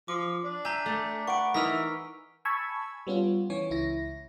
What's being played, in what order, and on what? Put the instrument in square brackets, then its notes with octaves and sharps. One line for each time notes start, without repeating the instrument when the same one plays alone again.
[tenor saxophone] F3 [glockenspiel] D6
[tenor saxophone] D4
[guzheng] E5 [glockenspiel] G#5 A#5 [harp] G6
[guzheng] A3
[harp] B4 F#5 [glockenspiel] C#6 D7
[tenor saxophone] E3 [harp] D#4 [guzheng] A#4 D#5 A#5 [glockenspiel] E6 F6 B6
[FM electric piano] G#5 A5 B5 C#6 E6 G#6
G3 B3 C#4 F4
E3 C#4 C#5
C#2 E4 A#6